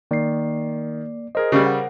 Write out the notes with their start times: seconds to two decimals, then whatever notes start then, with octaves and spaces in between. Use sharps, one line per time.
0.11 D#3 A#3 D5 C7
1.35 G#4 A#4 C5 D#5
1.52 C#3 G3
1.66 F#5